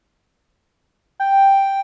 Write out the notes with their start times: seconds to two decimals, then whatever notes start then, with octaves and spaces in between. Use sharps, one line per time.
1.20 G5